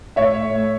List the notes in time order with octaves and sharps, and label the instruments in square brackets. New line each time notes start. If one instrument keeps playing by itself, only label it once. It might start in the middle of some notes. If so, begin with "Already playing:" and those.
[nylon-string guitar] A2 [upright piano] C#5 E5
[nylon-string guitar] A3